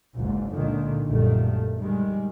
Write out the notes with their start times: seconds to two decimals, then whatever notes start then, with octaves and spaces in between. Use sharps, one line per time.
0.16 F#1 C#2 G#2
0.53 C#2 A#2 D3 D#3
1.05 A#1 F#2 D#3 G3 A3
1.78 D#3 G3 G#3